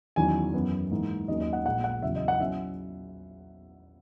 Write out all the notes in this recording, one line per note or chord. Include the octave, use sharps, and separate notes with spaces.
E2 D#3 F#3 C#4 G#5
F#2 E3 B3
G#2 E3 A#3
D#2 D#3 F#3 A#3 C#4 D#5
D#5
F#5
A#1 A#2 G#3 F#5
F#5
E2 C#3 F#3 E5
D#5
F#5
F#3 C#4 E4 E5